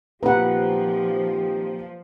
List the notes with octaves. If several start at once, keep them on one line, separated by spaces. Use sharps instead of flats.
A#2 D#3 F3 C4 G4 B4 F#5 A#5